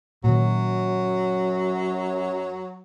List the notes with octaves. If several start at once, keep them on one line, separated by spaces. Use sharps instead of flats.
F#2 A#2 D#3 F#3